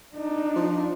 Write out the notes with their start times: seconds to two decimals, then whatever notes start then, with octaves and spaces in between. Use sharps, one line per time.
0.16 D4 D#4
0.56 F3